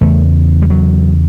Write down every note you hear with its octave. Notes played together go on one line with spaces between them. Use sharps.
E2 C#3 A3
G3
F#3